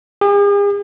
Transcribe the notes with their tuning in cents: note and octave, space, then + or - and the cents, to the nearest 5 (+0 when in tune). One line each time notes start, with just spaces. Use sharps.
G#4 -45